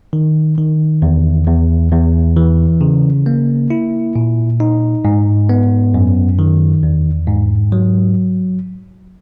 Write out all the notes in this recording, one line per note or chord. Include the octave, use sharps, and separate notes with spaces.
D#3
D#3
E2
E2
E2
E3
C#3
A#3
E4
A#2
D#4
G#2
B3
F#2
D#3
E2
G#2
F#3